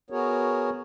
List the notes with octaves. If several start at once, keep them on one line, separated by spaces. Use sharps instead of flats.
B3 F#4 G#4 A#4 C#5